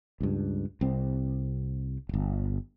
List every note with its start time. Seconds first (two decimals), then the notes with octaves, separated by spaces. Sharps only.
0.21 C#2 G2
0.81 C2 C4
2.09 D1 G1